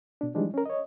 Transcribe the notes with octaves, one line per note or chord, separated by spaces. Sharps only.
B2 D4
E3 F3 G3 G#3 D4 D#4
C#4 A#4
C#5 D#5